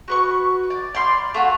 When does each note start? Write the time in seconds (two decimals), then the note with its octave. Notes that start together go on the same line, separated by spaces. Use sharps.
0.08 F#4 B4 C#6
0.70 D5
0.95 D5 B5 C6 F6
1.34 A3 F4 F#4